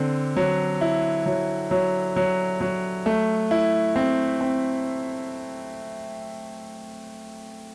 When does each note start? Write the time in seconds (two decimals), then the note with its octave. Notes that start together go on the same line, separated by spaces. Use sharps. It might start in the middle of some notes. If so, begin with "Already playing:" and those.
Already playing: D3 C4
0.37 F#3
0.81 E4
1.26 F#3
1.71 F#3
2.16 F#3
2.61 F#3
3.06 A3
3.51 E4
3.96 C4
4.41 C4